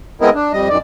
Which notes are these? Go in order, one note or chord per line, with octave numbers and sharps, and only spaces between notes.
G#3 B3 C4 E4 A#4 D#5
D4
F2 G3 D#5
F#2 D#3 D5